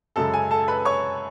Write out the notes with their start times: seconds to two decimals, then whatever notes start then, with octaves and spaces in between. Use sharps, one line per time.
0.16 F#2 C#3 G#3 A4 A5
0.34 G#5
0.51 A4 A5
0.68 B4 B5
0.85 C#5 C#6